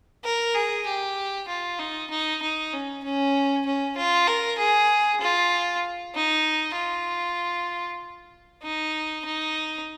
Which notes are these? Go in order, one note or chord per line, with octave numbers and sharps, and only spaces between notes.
A#4
G#4
G4
F4
D#4
D#4
D#4
C#4
C#4
C#4
F4
A#4
G#4
F4
D#4
F4
D#4
D#4